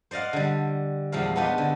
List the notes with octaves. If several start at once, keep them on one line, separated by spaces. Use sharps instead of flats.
C5 D5 D#5 F5 F#5
D3 G3
E2 A#2 F3 G3 A3 F5
B3 D4 D#4 F4 G4 B4
D3